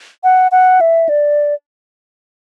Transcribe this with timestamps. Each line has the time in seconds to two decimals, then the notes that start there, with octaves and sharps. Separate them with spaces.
0.24 F#5
0.52 F#5
0.81 E5
1.09 D5